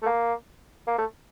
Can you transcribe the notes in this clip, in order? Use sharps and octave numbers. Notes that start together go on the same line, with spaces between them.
A3
A#3
A#3
A3